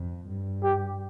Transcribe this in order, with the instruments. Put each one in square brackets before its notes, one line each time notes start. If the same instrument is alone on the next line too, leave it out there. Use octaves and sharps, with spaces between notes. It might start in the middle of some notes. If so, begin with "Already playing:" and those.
Already playing: [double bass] F2
G2
[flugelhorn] G4